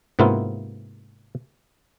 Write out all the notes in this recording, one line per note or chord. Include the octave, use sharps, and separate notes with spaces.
G#2 C3 A#3 B3 E4 F4